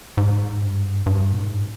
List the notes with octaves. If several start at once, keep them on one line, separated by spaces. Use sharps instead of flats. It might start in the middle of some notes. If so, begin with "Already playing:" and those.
G#2
G2
G2
A#2
G#2